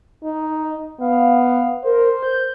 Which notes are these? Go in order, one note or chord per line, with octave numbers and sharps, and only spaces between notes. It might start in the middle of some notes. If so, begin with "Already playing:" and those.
D#4
B3 F5
A#4 C5
G6